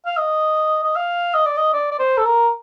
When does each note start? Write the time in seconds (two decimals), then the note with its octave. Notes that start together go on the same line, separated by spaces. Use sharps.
0.06 F5
0.17 D#5
0.83 D#5
0.96 F5
1.34 D#5
1.46 D5
1.57 D#5
1.73 D5
1.91 D5
1.99 C5
2.17 A4
2.25 A#4